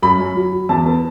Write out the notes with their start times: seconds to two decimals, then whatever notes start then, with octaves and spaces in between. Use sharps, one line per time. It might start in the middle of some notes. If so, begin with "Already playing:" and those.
0.02 F#2 B5
0.20 F#2
0.37 F#3
0.52 F#3
0.69 E2 A5
0.86 B3